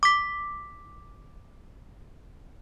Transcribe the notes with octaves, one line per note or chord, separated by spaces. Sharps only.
D6 B6